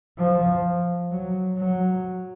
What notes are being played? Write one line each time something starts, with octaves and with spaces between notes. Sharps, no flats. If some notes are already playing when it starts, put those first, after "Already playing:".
F3
F#3
F#3